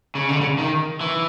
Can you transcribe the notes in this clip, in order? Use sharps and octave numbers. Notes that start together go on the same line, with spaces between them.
C#3
D3
C#3
D#3
E3